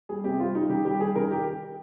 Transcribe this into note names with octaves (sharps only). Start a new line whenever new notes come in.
G3 G#4
C3 G4
G3 F4
G3 D#4
D#3 G4
G3 G4
G3 G#4
D#3 A#4
G4